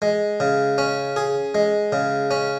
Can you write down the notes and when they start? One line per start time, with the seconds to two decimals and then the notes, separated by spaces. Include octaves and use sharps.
0.02 G#3
0.40 C#3
0.78 C#4
1.16 G#4
1.55 G#3
1.92 C#3
2.31 C#4